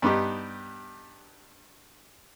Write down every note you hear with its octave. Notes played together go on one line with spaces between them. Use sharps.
G2 B3 D#4 G4